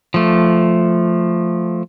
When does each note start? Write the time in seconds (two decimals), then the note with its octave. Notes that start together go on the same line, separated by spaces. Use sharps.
0.14 F3 A3